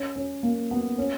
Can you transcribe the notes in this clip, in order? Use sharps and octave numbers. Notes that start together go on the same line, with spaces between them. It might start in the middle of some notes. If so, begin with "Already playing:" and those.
Already playing: C#4
C#4
A#3
B3
C#4